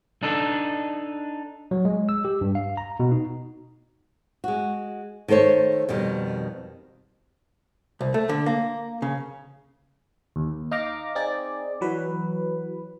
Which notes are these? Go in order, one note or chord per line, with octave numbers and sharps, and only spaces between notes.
D4 D#4 A4
F#3
G#3
E6
G4
G2
F5
A#5
B2
D#4
G#3 F#4
D#3 A3 A4 C5 C#5
F2 B2 D#3 G3
C2
A3
D3
A#3
C#3
D#2
D#4 F5 A#5 D6
C4 D#4 G#4 D5
E3 F#3 B4